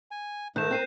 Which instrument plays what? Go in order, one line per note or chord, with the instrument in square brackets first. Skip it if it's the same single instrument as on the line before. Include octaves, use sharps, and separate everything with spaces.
[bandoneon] G#5
[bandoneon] G#2 A3 [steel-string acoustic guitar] D#3 [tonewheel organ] A#4 [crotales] F#6 G6 E7
[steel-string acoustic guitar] C4 [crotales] F#6 C7 D#7